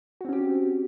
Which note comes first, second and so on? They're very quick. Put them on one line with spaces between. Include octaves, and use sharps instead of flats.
F#4 C4 C#4 G4